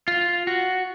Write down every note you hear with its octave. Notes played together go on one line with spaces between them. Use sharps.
F4
F#4